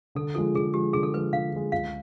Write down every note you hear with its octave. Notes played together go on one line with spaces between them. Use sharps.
D3 A4
F3 G#3 A4
D3 G#4
F3 G#3 G4
D3 G#4
A4
F3 G#3 B4
D3 F5
F3 G#3
C#2 F5